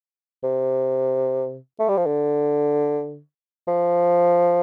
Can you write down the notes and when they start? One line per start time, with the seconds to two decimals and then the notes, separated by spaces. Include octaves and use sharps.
0.43 C3
1.80 A3
1.88 G3
1.97 F3
2.06 D3
3.68 F3